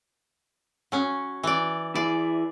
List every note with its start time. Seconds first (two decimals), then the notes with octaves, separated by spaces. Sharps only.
0.92 F#3 C#4
1.43 E3 D5
1.95 E3 G#4 D5